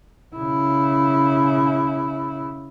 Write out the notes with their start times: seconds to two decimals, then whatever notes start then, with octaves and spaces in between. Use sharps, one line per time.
0.37 C#3 E4